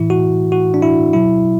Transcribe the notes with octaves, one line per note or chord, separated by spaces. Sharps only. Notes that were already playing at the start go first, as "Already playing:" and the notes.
Already playing: A2 E3 E4
F#4
F#4
D4
E4
B2 F#3 E4